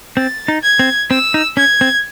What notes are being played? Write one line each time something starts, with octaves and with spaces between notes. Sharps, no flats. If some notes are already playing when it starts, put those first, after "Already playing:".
C4 A6
D#4
G#6
C4
C4 E6
D#4
C#4 G#6
C4